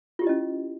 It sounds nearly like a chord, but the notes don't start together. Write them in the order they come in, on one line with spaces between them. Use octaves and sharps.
F4 G4 E4 D#5 C#4